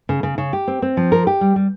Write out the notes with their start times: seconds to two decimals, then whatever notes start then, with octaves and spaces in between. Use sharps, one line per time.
0.09 C#3
0.23 C#3
0.38 C#3
0.53 G4
0.68 C4
0.82 C4
0.97 F3
1.12 A#4
1.27 G4
1.41 G3
1.56 G3